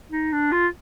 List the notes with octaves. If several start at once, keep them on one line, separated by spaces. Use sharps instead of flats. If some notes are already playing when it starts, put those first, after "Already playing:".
D#4
D4
F4